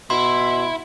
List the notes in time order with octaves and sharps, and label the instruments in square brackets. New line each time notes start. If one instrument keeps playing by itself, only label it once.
[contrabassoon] B2 [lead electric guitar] E4 [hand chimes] C6